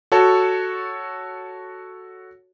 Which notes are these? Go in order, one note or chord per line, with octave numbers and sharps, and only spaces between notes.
F#4 A4 C#5 A5